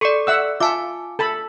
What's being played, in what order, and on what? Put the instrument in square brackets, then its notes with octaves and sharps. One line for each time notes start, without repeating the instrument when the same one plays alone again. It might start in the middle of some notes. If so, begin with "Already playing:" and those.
[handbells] A4 D5 [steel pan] C6 C#6
[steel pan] E5 F#5 E6
[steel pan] F4 E5 [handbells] G#5 A5 D6
[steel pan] A4 A5 B5